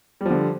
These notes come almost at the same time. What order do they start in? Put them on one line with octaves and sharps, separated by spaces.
G3 F3 D3